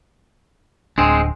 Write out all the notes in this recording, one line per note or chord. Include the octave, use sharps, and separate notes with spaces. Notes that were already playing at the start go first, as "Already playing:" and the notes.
D1 G#3 C4 D4